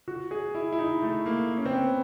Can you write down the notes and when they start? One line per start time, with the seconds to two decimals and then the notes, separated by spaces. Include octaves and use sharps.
0.08 F#4
0.31 G#4
0.55 E4
0.73 E4
0.79 D#4
1.02 A3
1.26 A#3
1.57 C#4
1.66 C4
1.73 B3